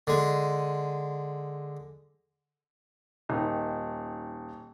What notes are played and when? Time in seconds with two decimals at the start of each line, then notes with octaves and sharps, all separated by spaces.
0.07 D3 G#3
3.29 D#1 D#3 D#4